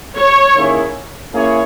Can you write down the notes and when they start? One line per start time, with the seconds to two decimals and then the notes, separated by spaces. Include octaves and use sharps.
0.16 C#5
0.54 D#3 A#3 C#4 E4 G#4
1.33 A#3 C#4 E4 G#4 C#5